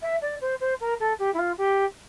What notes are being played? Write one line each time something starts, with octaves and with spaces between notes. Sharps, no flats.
E5
D5
C5
C5
A#4
A4
G4
E4
F4
G4